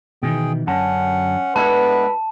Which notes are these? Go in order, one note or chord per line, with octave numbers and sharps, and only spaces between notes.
B2 D#3 E3 G#4 G5
F#2 D3 C#4 F#5 A5
G#3 B3 D4 E4 A4 B4 A5